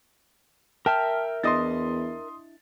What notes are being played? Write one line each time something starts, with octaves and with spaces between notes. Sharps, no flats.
A#4 E5 G5 A5 F6
E2 D4 E4 D#5 C6 D#6 A6